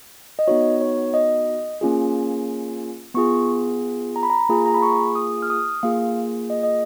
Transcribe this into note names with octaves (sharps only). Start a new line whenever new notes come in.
D#5
B3 D#4 F#4 C#5
C#5
D#5
A#3 C#4 F4 G#4
B3 F4 G#4 C#6
A#5
B5
A#5
A#3 F4 G#4
A#5
B5
C#6
D#6
F6
D#6
A#3 F4 G#4 F5
D#5
D#5